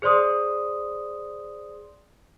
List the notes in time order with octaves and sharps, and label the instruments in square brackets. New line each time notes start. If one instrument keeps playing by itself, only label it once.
[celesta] G#4 C5 D5 C6 D#6